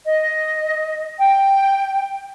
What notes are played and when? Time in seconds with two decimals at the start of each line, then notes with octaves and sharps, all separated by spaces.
0.05 D#5
1.19 G5